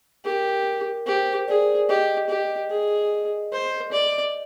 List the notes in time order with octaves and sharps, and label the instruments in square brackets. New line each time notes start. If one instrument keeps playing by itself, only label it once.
[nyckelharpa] G4 [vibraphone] A#4
[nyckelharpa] G4 [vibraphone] C5
[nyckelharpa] G#4 [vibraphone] D5
[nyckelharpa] G4 [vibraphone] D#5
[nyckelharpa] G4
G#4
C5
D5